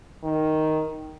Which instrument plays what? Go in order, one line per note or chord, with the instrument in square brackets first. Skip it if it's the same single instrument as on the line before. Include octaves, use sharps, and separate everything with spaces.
[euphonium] D#3